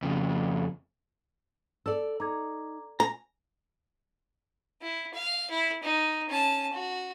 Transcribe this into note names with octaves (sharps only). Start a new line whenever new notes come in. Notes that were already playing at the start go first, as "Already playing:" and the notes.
F2 C#3
A4 D5 E6
D#4 A#5 D6 G#6
G#5 A#5
E4
F5
E4
D#4
C#4 A5
F#4